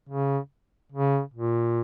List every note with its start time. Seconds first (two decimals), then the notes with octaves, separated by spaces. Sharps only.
0.09 C#3
0.92 C#3
1.34 A#2